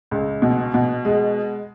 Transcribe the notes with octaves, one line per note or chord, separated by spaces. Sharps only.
C#2
B2
B2
G#3